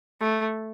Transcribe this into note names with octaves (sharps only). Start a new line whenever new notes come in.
A3